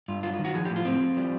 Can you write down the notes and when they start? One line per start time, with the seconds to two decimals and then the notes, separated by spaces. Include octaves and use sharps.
0.08 G2 F4
0.23 F#3 F4
0.34 F4
0.39 D#3
0.45 F#4
0.54 F3 G#4
0.65 G4
0.70 A2
0.76 F4
0.85 A2 C4
1.01 F3
1.17 G3